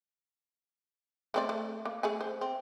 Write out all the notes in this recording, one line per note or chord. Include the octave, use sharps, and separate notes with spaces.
A3 C4 D5
A3
A#3
A3 G#4 G#5
C5
C4